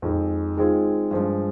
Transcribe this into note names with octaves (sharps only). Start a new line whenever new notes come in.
F2 D#3 G#3
D#3 G#3 C4 F4 G#4
G2 F3 G#3